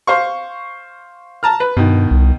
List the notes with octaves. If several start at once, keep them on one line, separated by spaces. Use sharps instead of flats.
C5 F5 C#6
A5 A#5 F6
B4
G2 B2 D#3
C2